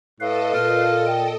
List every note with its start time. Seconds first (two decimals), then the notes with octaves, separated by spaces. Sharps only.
0.20 A2 A4 B4 D#5 F5
0.54 A#2 F4
1.06 G5